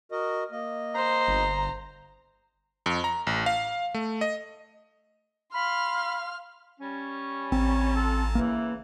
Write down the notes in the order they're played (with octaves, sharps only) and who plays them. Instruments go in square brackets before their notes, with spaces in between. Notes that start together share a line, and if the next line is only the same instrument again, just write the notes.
[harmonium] F#4 A#4 D#5
A#3 D#5
[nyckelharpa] C5 [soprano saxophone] A#5
[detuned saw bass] G1
[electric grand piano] F2
A#5
A1
F5
A3
D#5
[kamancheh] F5 C6 [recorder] B5 [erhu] F6
[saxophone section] G3 C#4
[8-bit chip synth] A1 [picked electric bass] C4
[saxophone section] F4 A4
[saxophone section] C#3 E3 [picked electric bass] A#3